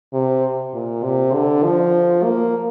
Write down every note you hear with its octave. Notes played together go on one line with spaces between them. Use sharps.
C3
A#2
C3
D3
F3
A#3